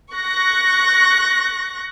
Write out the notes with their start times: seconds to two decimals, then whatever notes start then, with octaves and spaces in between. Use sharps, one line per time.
0.13 C#6 F#6 A#6